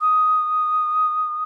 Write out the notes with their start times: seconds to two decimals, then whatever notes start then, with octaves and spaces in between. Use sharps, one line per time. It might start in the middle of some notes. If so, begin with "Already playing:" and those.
0.01 D#6